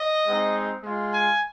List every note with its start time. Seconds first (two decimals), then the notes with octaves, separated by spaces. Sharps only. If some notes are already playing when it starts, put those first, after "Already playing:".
Already playing: D#5
0.27 G#3 C4 D#4
0.84 G#3 F4
1.12 G#5